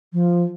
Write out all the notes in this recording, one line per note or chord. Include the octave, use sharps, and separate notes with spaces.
F3